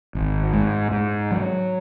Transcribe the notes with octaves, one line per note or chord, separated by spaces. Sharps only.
G#1
G#2
G#2
F#3